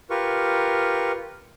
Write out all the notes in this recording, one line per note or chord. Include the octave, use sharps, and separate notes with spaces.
F4 G4 A#4 B4 C#6